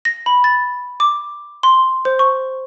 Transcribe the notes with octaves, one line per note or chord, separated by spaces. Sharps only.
A#6
B5
A6
D6
C6
C5
C#6